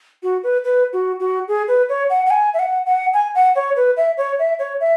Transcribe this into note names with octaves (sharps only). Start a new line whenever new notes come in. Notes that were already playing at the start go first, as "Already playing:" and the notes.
F#4
B4
B4
F#4
F#4
G#4
B4
C#5
F#5
F#5
G#5
E5
F#5
F#5
G#5
F#5
C#5
B4
E5
C#5
E5
C#5
E5